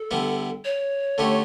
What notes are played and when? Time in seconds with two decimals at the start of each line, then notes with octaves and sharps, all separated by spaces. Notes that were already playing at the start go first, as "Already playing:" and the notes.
Already playing: A4
0.11 D3 G3 B3 E4
0.65 C#5
1.18 D3 A3 C#4 G4